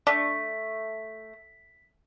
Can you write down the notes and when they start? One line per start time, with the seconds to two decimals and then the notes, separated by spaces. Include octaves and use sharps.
0.07 A3 D4 B6